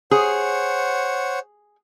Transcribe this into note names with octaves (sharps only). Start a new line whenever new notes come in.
G#4 C5 C#5 F#5